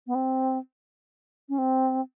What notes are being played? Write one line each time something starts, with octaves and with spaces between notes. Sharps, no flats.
B3
C4
C#4
C4